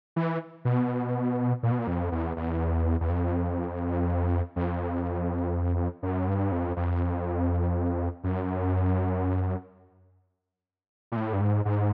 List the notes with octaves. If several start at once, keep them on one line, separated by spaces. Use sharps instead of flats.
E3
B2
A#2
B2
A#2
F2
E2
E2
E2
F2
F2
F#2
G2
F2
F2
F#2
A#2
A2
G2
G#2
G#2